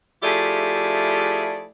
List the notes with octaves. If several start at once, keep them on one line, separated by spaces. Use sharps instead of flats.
F3 A3 E4 G4 G#4 D5